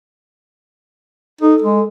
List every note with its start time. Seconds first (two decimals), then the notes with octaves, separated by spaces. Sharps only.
1.41 D#4 A4
1.62 G#3